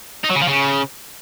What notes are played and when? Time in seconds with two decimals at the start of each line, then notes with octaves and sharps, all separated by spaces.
0.24 D#4
0.30 F#3
0.36 C#3
0.42 F3
0.48 C#3